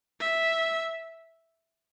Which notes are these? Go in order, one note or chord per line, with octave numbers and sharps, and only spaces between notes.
E5